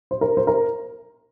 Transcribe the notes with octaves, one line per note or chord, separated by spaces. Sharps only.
C5
A#4
C5
A#4